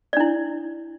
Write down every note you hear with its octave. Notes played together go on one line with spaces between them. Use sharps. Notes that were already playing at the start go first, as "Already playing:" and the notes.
D4 E4 D5